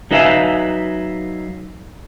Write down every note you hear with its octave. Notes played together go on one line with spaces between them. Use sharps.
F#3 D#4 B4 E5 F5